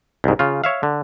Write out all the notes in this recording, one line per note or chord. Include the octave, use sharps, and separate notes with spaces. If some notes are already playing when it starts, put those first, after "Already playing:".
C2 G#2
C#3 F4
C#5 E5 F5
D3